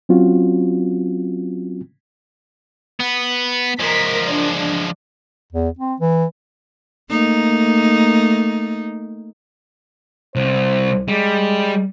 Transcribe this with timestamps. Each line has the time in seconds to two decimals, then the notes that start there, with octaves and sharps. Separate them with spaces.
0.09 F#3 C4 C#4 F4 F#4
3.00 B3
3.80 F3 G#3 A#4 B6
4.29 D4
5.53 E2
5.79 C4
6.00 E3
7.10 A3 A#3 D#4
10.35 C2 C5
11.08 G3 G#3